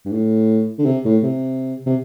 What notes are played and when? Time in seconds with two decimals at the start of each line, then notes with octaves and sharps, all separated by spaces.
0.06 G2
0.12 A2
0.79 D3
0.85 C3
1.05 A2
1.23 C3
1.86 C3